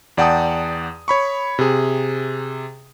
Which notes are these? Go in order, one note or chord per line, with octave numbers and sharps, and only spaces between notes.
E2 D5 F#5 G5 A5 D#6
C#5 B5 C#6
C3 G#4